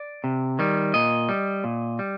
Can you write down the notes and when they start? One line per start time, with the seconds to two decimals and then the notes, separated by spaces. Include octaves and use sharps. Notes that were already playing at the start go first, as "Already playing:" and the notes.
Already playing: D5
0.24 C3
0.59 D#3 G3
0.94 A#2 D#5
1.29 G3
1.64 A#2
1.99 G3